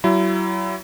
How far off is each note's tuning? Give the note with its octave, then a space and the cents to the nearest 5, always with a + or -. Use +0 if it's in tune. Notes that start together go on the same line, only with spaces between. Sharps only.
F#3 +35 E4 +30